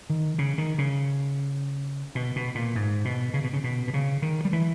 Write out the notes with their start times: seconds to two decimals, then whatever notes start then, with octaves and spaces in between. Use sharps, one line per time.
0.10 D#3
0.38 C#3
0.58 D#3
0.78 C#3
2.15 B2
2.36 B2
2.55 A#2
2.75 G#2
3.05 B2
3.34 C#3
3.44 B2
3.53 C#3
3.64 B2
3.88 B2
3.94 C#3
4.22 D#3
4.45 G3
4.53 E3